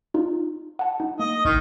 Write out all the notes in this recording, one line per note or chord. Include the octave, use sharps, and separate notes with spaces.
D#4 F4
F#5 A5
D#4
A#3 D#5
A1 D#3